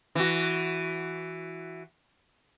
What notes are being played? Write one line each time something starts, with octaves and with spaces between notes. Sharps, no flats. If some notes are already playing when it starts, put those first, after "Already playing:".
E3 F#4